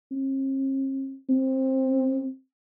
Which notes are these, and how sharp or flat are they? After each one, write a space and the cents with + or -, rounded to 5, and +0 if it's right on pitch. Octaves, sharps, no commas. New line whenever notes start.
C4 +45
C4 +15